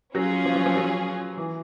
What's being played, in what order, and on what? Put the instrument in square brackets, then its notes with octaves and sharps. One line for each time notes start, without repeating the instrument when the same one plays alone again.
[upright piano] F#3 [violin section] C#4 F4 G#4
[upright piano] F3
F3
F3
F#3
E3